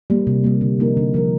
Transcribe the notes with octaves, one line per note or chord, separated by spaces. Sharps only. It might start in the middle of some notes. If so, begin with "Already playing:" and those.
G3 A#3
C3
G3 A#3
D3
F3 A#3 D#4 A#4
D3
F3 A#3 D#4 A#4